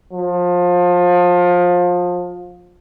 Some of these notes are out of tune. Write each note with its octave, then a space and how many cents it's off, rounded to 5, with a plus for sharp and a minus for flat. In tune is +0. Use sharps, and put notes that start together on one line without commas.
F3 +25